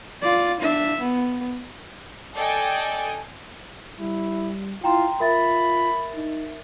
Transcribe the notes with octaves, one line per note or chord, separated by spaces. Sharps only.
F4 D5
D4 E5
B3
A4 D5 D#5 G5 G#5
G3 E4
E4 F4 G5 A#5 C6
F4 A#4 E5 B5 A6
D#4